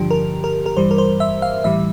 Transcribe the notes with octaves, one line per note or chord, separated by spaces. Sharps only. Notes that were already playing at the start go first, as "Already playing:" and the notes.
Already playing: G2 D3 F3 G4
A#4
A#4
A#4
G2 E3 G3 C5
A#4
C5
E5
F5
A2 E3 G3 E5